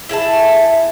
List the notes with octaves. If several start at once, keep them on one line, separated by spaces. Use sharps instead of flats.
E4 G#4 E5 A5